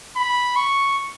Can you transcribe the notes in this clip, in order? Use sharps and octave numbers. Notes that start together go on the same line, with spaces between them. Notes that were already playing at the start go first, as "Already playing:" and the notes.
B5
C#6